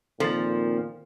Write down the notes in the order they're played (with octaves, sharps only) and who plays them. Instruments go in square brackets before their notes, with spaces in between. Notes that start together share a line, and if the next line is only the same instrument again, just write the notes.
[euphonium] A#2 [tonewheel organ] D#3 A#3 C4 [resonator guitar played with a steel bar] F3 [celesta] A4 A6